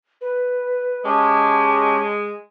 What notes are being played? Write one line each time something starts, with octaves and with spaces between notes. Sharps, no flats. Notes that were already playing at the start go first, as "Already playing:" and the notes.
B4
G#3 C#4 G4 A5